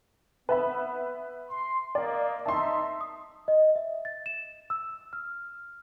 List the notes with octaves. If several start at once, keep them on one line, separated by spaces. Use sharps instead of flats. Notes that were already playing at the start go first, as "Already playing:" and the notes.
B3 B4 E5 B5
C6
A#3 D5 D#5
D#4 E5 A5 C6
D#6
D#5
E5
A6
E7
E6
F6